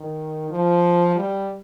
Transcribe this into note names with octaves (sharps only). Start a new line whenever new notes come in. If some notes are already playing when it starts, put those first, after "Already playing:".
Already playing: D#3
F3
G3